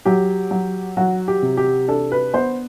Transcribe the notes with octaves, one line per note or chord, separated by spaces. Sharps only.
F#3 G4
F#3
F#3 F#4
G4
C3
G4
D4 A4
B4
B3 C5